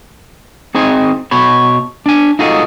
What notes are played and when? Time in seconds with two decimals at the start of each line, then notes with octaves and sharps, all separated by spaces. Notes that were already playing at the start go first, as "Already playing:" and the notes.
0.75 C4 D#4 G#4 C5 D#5 G#5
1.31 B2 C#5 B5
2.06 D4 G#5
2.39 D#4 F4 F#4 G#4 A4 D#5